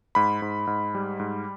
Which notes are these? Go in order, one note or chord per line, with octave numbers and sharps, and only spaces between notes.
G#2 B5
G#2
G#2
G3
G#2